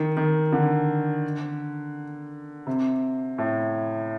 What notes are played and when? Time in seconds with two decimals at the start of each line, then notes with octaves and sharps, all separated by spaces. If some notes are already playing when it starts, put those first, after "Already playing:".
Already playing: D#3
0.17 D#3
0.53 D3
2.67 C3
3.38 A2